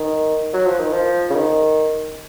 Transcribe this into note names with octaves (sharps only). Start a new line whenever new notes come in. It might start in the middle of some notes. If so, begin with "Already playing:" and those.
Already playing: D#3
F#3
F3
D#3
F3
C#3
D#3